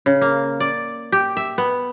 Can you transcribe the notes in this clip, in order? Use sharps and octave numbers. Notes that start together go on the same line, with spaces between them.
C#3
A#3
D5
G4
E5
B3